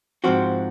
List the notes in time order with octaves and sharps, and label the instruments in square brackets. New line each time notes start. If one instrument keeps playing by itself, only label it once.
[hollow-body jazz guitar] G#2 F3 C4 F#4